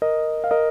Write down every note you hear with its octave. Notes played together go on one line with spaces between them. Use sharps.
A#4 D#5
F5
A#4 D#5